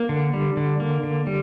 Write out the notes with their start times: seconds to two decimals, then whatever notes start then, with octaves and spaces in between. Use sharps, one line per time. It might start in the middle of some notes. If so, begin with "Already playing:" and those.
Already playing: A#3
0.09 D3
0.34 G3
0.57 D3
0.80 A#3
1.03 D3
1.27 G3